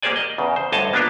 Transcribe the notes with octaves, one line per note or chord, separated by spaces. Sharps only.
A#3 G4 G#4 C5 D5 G#5
D#5
E2 C#3
C5
D2 G2 C5 C#5 D#5 A5
A#3 B3 D4 F4 A#4